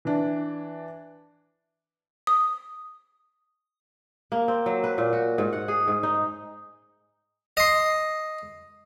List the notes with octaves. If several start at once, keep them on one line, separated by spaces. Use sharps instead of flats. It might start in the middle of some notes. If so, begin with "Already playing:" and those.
E3 D4
D#6
A#3
C4
F#3
B4
A#2
F#4
G#2
F#5
G#4
G#2
D#4
D#5 C6